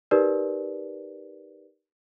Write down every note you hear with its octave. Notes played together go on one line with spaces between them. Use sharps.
D#4 G4 A#4 B4 D5